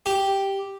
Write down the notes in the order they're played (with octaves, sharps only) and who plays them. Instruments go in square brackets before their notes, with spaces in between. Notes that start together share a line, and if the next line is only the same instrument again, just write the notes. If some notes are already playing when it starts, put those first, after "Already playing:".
[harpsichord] G4